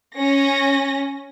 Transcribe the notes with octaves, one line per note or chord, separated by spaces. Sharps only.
C#4 A#6